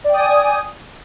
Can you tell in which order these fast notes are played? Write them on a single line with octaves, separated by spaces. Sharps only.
D5 G5 D#6 G#5